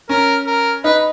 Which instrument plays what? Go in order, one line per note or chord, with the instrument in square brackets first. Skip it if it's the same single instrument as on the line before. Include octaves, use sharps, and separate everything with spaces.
[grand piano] C#4 [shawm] A#4
[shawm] A#4
[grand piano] D#4 [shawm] B4